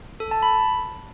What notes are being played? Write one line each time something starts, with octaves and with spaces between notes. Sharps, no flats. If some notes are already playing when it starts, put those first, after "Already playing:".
A4
A5
B5